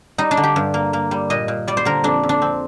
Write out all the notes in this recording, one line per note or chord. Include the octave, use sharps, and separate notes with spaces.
G3 D#4
D4
D3
G4
G2
A#3
A#3
G3
A#2 D#5
A#2
G3 D5
C5
D3 A#4
F2 D4
F2
D4
C4